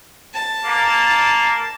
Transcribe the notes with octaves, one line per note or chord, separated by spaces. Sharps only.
A5
A#3